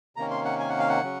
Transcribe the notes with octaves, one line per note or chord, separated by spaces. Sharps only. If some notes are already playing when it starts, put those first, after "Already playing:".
C3 D#3 A#3 C#4 A#5
C6
F#5
G#5
F#5
F5
F#5
C#3 F#3 C#4